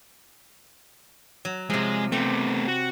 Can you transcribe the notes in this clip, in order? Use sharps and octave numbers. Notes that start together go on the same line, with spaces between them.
F#3
C3 F3 G#3
A3 B3 C4 G4
F#4